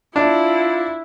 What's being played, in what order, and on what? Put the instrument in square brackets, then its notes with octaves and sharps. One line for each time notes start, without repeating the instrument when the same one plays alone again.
[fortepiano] D4 [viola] E4 [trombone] F4